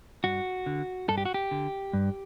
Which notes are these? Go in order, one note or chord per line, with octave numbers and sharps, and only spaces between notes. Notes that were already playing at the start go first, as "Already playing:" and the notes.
G2 F#4
D3
G2 A4
G4
F#4
G4
D3
G2